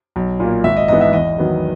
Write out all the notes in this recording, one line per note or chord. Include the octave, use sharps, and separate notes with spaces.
B1
A#2 A#3
G#1 E5
D#5
G#2 E3 B3 D#5
E5
E2 D#5
D#3 F#3 B3